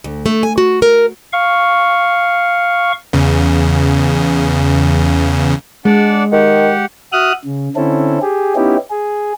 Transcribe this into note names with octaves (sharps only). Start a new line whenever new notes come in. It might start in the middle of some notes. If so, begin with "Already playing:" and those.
D2
A3
G#5
F#4
A#4
F5 C#6
E2 C#3
G#3 D4 D5 F#5
D#3 G4 F#5
F#4 E5 D#6 F6 F#6
C#3
D3 C4 C#4 E4 A4
G4 G#4
B3 C#4 D#4 E4 G4
G#4